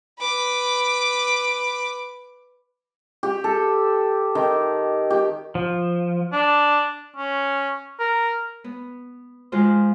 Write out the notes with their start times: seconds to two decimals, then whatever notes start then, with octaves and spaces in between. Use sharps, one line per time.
0.19 B4 D6
3.23 G4
3.44 A4
4.35 D#3
5.10 G4
5.55 F3
6.32 D4
7.16 C#4
8.00 A#4
8.64 B3
9.52 D#3 F3 G#3 F4 C5